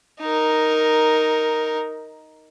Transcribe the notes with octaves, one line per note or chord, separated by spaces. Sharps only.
D#4 A#4